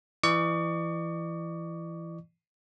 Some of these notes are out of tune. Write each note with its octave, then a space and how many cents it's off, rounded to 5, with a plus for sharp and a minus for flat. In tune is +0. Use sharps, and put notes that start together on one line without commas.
E3 +20 D5 +40 C#6 +30